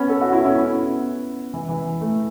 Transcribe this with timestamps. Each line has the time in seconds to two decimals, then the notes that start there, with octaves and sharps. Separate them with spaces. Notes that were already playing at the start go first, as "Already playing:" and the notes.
Already playing: B3 C#4
0.09 A4
0.21 F#4
0.33 E4
0.45 C#4
0.57 B3
1.54 E3
1.69 E3
2.01 A3